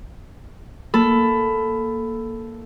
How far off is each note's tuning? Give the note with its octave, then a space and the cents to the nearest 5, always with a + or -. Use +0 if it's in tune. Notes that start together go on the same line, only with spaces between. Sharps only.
A#3 +0 A4 +0 B5 +15